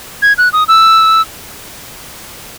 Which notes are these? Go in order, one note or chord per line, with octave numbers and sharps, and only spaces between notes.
G#6
F#6
D#6
E6